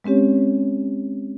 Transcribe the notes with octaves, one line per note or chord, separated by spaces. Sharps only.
G#3 C4 C#4 G4 C#5